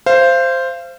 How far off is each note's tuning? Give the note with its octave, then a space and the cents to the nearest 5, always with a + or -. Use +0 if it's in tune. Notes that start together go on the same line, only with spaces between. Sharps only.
C5 +0 F5 -30